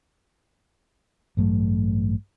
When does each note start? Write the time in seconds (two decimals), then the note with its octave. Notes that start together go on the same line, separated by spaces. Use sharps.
1.37 A1 G2 F#3 A3